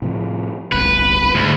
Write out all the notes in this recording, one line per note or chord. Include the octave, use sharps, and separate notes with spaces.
A2 C3 F3
D1 G1 C2 B4
D2 G#2